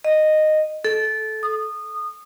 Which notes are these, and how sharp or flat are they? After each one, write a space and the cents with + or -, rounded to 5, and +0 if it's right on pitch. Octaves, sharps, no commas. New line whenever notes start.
D#5 -10
A4 -15
D#6 -20